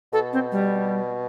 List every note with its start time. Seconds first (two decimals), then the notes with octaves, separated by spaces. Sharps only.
0.13 B2 A4
0.33 C4
0.52 G3